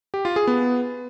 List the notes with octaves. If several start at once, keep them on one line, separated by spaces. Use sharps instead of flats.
G4
F4
G#4
B3